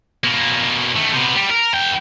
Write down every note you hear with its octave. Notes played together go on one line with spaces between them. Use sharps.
B2 A#3
D#3 A3
C3 B3
G3
A#4
E2 G5